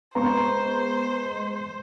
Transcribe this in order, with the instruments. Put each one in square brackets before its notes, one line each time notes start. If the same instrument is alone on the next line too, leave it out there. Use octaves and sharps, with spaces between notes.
[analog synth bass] G#3 [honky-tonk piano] B3 [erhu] C5 [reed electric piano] A#5 C6 C#6